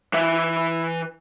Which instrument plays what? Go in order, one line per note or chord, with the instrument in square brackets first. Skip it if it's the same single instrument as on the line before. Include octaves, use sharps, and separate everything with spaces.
[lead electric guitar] E3 E5